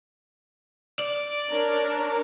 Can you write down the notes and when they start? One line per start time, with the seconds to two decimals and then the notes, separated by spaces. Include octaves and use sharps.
0.99 D5
1.50 D4 A#4 C#5